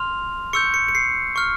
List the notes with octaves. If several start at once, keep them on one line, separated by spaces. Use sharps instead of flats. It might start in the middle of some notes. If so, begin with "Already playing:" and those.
Already playing: C6 F6 F7
C#6 E6 G6 C#7
C#7
C#7
C7
C#6 F6